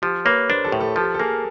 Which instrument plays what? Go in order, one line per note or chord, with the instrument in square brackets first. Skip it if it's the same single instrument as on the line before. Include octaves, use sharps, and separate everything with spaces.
[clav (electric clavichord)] F3 [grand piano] G4
[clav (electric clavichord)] A#3 [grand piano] B4 C#5
[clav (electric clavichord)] D4 [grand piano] A#4 C5
[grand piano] G4 A4
[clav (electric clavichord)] A2
[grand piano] G4 A4
[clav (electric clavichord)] F3 [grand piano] G4 A4
[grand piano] A4
[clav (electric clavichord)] A#3 [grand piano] G#4 A#4